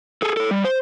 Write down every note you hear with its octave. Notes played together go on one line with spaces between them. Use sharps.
G#4 A4
A4 C#5
G3
C5